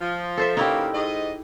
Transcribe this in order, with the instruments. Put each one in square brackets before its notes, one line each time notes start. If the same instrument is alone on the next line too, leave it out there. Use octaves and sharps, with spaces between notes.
[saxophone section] F3
[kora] A4 C5 E5
[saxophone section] C#3 A#3 [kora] D#4 E4 G4
[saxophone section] G#2 D#5